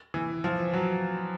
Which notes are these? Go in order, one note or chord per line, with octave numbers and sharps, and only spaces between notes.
E3
F3
F#3